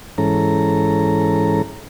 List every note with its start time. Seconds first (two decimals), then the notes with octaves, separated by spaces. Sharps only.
0.18 G#2 E3 C#4 A4 A#5